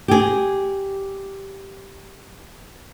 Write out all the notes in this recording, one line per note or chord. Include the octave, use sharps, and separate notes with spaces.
G4 G#4